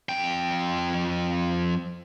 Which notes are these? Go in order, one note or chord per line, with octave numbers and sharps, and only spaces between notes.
F2 G5